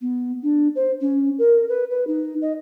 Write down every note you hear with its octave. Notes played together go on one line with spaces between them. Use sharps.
B3
D4
C5
C#4
A#4
B4
B4
D#4
D#5